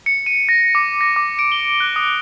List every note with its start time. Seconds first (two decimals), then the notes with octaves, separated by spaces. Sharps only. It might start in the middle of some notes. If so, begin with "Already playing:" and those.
0.06 C#7
0.26 D#7
0.49 A#6
0.75 D6
1.01 A#6
1.16 D6
1.39 D7
1.52 G7
1.80 F#6
1.96 D#6